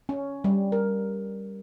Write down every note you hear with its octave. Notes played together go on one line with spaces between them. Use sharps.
C#4
G3
A#4